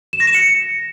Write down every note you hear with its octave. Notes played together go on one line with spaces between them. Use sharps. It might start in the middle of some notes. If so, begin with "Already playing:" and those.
E7
A#6
E7
C#7